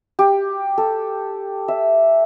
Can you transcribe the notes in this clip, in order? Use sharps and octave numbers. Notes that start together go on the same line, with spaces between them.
G4
A4
E5